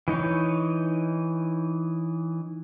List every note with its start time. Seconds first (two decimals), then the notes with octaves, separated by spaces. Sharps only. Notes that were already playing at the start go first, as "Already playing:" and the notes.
0.08 E3 D#4 C#5